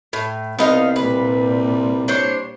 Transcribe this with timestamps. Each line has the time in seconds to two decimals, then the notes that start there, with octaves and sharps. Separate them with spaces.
0.13 A2
0.59 C2 B3 D#4 F5
0.96 A#2 G3 B4
2.08 D4 C5 C#5